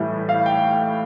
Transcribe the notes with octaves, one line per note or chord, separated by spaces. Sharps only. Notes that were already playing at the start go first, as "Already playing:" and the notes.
Already playing: A2 E3 G3
F5
G5